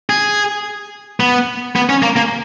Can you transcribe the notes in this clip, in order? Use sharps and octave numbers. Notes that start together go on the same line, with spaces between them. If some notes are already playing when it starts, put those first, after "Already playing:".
G#4
B3
B3
C#4
A#3
A#3